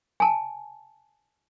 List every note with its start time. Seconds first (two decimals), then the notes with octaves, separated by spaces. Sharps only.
0.20 G#5 A5